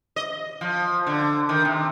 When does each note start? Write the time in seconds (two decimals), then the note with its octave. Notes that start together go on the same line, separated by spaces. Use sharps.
0.16 D#5
0.61 F3
1.07 D3
1.49 D#3
1.65 C3